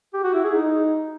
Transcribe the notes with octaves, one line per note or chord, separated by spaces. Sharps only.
G4
F#4
E4
G#4
D#4